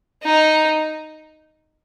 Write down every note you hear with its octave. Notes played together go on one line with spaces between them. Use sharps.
D#4